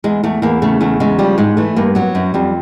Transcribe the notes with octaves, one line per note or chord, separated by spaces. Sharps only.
E2 G#3
E2 A3
E2 A#3
C#3 A3
E2 A3
C#3 G#3
F3 G3
G#2 G#3
E3 A3
G2 A#3
F#3 B3
F#2
F2 G3